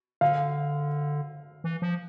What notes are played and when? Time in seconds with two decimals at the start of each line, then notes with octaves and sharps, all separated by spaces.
0.21 D3 F5
1.64 E3
1.82 F3